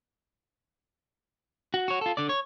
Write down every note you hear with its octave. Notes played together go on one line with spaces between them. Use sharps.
F#4
F#4 C#5
F4 A4
D3 D5
C#5